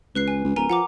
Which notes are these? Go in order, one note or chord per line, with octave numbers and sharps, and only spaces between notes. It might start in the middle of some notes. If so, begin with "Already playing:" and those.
C#2 B4 F#6 C7
G#5
C#2
D1 A#4 G#5 A#5
F3 F#5 A#5 D6